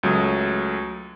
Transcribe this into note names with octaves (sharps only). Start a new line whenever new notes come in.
C#2 F#3 A3 D#6